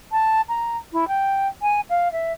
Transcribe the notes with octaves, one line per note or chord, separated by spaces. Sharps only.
A5
A#5
E4
G5
G#5
F5
E5